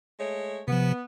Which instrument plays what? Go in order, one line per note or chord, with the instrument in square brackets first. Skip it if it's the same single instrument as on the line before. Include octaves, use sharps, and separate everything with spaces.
[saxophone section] G#3 A3 C#5
[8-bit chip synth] C3 F3 [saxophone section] B3